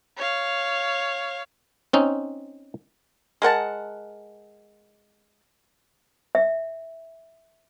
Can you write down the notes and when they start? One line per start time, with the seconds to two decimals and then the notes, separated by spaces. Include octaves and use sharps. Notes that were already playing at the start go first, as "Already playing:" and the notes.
0.17 C#5 F5
1.93 C4 C#4 D#4
3.42 G#3 A#4 F#5 A5
6.35 E5